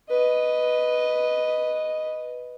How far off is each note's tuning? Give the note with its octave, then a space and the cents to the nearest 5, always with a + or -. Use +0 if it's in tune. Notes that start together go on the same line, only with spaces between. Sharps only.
B4 +0 D#5 +0